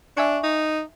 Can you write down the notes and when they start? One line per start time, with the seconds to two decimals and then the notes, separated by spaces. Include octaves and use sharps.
0.17 D4 E5 G#5 C#6
0.43 D#4